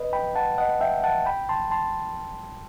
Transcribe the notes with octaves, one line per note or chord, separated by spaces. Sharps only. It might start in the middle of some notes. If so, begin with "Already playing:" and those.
Already playing: B4 D#5
G5 B5
F#5 A5
D#5 F#5
E5 G5
F#5 A5
G5 B5
A5 C6
A5 C6